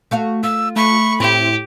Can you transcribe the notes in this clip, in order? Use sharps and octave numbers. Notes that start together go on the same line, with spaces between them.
A3 F#4 F5
F4 E6
A3 B5 C#6
A2 C4 E4 G4